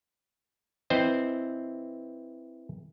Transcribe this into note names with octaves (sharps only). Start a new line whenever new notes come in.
E3 C4 C5 D#5